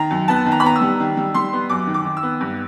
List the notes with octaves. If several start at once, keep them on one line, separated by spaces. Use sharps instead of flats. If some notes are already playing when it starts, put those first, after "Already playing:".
Already playing: D#3 A#5
F#2
B3 A5
D#3
A#5
B5
B3 A#5
E6
G3
D#3
G3
G3 C6
B3
F#2 D6
D#3
D6
D#3
E6
B3
G2